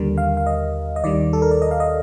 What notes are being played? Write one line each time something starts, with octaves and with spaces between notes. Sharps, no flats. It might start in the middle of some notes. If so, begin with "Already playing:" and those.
Already playing: D#2 D3 G3 A#4
F5
F5
D#5
D#5
D#2 D#3 G3 D5
A4
A#4
D5
D#5
F5
D#5